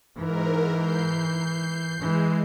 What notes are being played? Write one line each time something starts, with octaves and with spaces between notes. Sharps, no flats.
G#2 E3 A#4
G6 C7
E3 G#3